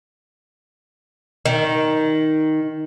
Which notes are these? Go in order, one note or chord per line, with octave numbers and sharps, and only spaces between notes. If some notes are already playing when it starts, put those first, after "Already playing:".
D#3